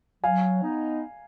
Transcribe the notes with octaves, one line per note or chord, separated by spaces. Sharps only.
F#3 F5 G#5
B3 D#4